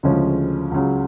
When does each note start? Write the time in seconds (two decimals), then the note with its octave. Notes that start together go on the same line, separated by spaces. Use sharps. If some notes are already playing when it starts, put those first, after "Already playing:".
0.03 D2 C#3 F3 G#3 C#4
0.71 C#2 C#3 F#3